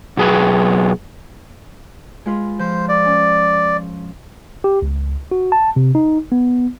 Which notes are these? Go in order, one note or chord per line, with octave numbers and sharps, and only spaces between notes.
B2 F#3 G#4 B4
G#3 F4 B4
F3 C5
D5
C#4
G4
C#2
F#4
A5
C3
D#4
B3